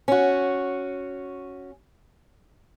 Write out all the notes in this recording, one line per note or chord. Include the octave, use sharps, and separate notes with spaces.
C#4 F#4